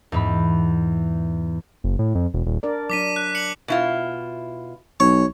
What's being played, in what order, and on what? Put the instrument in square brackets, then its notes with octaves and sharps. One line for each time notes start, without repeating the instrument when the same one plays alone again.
[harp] E2 G#2 B5
[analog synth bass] F#1
A2
F2
E1
D#1
[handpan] D4 A#4 D5
[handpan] F#3 D4 [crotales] D6 B6 D#7
[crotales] F#6
C#7 F#7
[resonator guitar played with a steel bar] B2 E4 F4
[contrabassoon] B1 [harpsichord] C#5